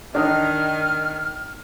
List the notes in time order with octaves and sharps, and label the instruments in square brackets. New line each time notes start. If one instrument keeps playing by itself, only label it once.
[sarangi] D#3 [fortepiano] D4 D#4 D5 [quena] F6